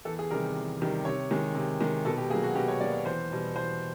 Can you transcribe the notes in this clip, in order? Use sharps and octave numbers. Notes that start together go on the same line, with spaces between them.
E2 A4
G#4
C3 D#3 G3 A#4
E2
C3 D#3 G3
C3 C#5
D#3 G#3
C3
D#3 G#3
B2 A4
G4
F#3 A#3 G#4
F#4
B2 G4
C#5
F#3 A#3 D5
C#5
E2 C5
B2 G3
E2 C5